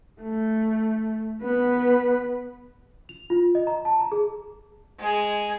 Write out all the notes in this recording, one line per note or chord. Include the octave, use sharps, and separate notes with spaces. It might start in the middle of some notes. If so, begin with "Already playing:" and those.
A3
B3 B4
F7
F4
D#5
A#5
A5
A#5
G#4
G#3 G#4